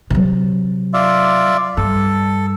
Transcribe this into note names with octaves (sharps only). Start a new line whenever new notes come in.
C3 F#3
F4 D5 E5
G2 A4